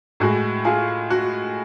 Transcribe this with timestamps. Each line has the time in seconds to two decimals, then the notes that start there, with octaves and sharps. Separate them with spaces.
0.20 A2 G#3 F#4
0.65 F4 G#4
1.10 F#4